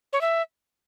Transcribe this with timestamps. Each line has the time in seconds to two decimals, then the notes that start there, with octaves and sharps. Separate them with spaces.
0.13 C#5
0.21 E5